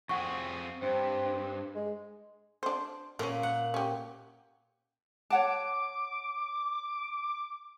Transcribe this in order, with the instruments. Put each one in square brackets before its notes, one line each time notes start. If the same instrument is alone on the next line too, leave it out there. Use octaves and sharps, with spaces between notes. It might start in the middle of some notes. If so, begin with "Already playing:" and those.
[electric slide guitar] F2 C4 G#4 [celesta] F#5 C#6
[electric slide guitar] G2 [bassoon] C4
[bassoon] G#3
[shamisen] D4 C5
[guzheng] A#2 [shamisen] C#4 A#4
[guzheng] F#5
[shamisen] C#4 G4
[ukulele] C#5 F#5 A5 [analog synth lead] D6